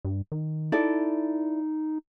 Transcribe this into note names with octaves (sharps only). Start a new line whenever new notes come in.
G2
D#3
D#4 E4 A4 D5